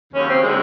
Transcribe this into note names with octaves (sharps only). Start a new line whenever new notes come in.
D#2 C#3 F#3 C#4
C4
D3 F#3 G#3